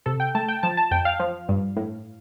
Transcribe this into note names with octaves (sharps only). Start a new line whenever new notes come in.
C3 A4
G5
A3 A5
G5
F3 A5
A5
F2 G5
F5
F3
G2
A2